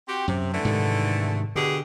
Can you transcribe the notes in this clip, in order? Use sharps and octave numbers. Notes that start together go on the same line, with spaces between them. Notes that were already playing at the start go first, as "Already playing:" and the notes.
C4 F#4 G4
F#2 C3
D3 E3 A3
G#2 C3 D#3
B2 D3 G4 G#4